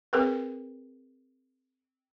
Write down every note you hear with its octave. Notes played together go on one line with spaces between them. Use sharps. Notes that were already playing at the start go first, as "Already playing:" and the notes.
C4 G#4 A#4 B4